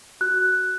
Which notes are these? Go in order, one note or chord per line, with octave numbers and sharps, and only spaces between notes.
F#4 F#6